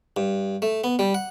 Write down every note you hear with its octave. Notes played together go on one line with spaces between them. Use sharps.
G2
A3
B3
G3
F#5